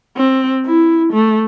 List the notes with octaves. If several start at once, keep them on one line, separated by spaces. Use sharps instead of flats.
C4
E4
A3